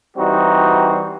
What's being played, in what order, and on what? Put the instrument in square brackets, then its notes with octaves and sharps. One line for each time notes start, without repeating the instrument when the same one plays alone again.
[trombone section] E3 G3 C4 D#4 F#4